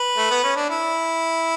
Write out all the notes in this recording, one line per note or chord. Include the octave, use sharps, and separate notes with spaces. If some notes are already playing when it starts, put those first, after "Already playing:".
Already playing: B4
A3
B3
C#4
D4
E4